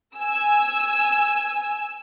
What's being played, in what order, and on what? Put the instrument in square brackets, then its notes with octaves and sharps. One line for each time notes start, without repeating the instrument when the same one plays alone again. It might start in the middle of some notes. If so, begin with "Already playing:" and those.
[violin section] G#5 E6